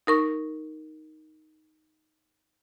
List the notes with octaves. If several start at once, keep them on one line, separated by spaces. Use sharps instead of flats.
D#4 A#4 C#6